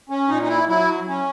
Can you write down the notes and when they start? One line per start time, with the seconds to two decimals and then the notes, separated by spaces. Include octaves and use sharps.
0.10 C#4
0.28 A#2 D#4
0.42 D#4
0.48 E4
0.68 F#3 E4
1.08 C#4